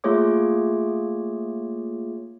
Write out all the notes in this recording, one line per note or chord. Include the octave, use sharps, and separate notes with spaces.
A3 A#3 F4 G#4 C#5 D6